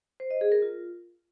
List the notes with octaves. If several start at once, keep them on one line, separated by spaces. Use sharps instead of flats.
C5
D#5
G#4
A#4
F4